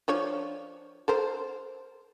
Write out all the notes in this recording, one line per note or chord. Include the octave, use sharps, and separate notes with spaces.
F3 D4 C#5
A4 A#4 C5